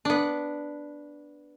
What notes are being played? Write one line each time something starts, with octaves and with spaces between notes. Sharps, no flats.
B3 D4